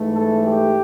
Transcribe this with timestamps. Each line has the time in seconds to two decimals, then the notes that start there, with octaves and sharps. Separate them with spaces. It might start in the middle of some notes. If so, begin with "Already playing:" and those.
Already playing: G#2 E3 A3
0.13 A4
0.43 G4